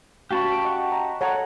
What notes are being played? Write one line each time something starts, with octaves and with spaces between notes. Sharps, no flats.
C#4 F#4 G4 F5 A5 B5
D7
D#5 F#5 C#6
A#5
A4 C#5 F#5 A#5